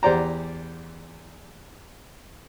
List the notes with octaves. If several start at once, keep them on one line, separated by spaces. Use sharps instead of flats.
E2 G4 C5 D5 A#5